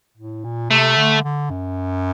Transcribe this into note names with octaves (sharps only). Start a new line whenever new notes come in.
A2
A#2
C3 A3
D3
D3
F#2